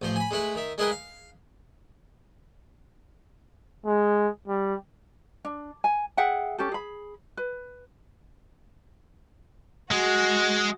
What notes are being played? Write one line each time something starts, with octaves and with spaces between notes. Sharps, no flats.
A1 F3 C5
G#5 B5
G#3 A3 E4 B4
D#3 E5
G#3 E4 G#4 A#4 B4 G5
F5
G#3
G3
D4
G#5
G#4 E5 F#5 G5
C#4 G4 A4
G#4 B5
B4
G#3 F#4